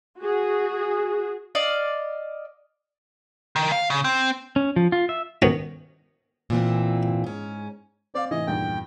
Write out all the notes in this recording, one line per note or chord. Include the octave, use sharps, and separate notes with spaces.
F#4 G#4
D5 D#5 F5
D#3
F5
C#3
C4
C#4
F3
F4
E5
B2 D#3 C#4
A#2 E3 C4
G#2 C#4
C4 D5 F5
A2 C3 E3 D#5
E2 G2 A#2 D#3 G5